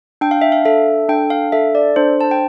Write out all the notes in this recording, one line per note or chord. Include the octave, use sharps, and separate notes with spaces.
D4 G5
F5
E5
F5
A4 E5
D4 G5
F5
A4 E5
D5
D4 C5
A5
G5